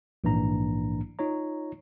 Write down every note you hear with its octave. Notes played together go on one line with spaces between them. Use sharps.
A#1 G#2 E3 A#3 D4 A#5
D#4 F4 C#5 A#5